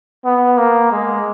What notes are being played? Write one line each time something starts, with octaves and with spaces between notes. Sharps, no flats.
B3
A#3
G#3